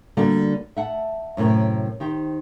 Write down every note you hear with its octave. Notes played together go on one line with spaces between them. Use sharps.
D3 G3 A#3 F#4 F#5
E5 F#5 A5
F#2 A2 C3 A#4
D#3 G4 C5